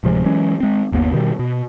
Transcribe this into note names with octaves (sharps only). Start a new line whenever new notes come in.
D1 C3 F3 G#3
E3 F#3 G#3 C#4
G#3 C4
G1 D#2 A#3 B3
B2 D#3 F3 G3
B2